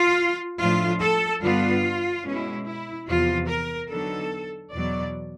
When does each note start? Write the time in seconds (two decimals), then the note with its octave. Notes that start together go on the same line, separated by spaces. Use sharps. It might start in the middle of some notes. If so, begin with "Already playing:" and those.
Already playing: F4
0.58 A2 F3 A3 D4 F4
1.01 A4
1.42 G2 D3 G3 B3 D4 F4
2.24 B2 G#3 C#4 E4
2.66 E4
3.07 E2 C3 F3 F4
3.48 A#4
3.90 D3 F#3 B3 D#4 A4
4.72 E2 B2 F#3 B3 D5